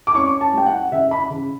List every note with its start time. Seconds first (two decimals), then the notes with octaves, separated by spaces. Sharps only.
0.07 D6
0.15 C#4 C#6
0.41 A5
0.54 G3 G5
0.66 F#5
0.92 C#3 E5
1.11 B5
1.30 C#3